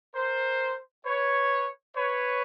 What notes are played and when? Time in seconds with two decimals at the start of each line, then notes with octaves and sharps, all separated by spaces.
0.14 A#4 C5
1.05 B4 C#5
1.96 B4 C#5